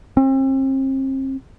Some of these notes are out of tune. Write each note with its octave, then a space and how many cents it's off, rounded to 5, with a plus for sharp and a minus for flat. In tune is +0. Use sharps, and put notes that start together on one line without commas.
C4 +40